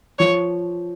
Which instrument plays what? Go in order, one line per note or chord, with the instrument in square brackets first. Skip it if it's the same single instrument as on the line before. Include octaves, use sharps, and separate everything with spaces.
[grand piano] F3 [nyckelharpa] C#5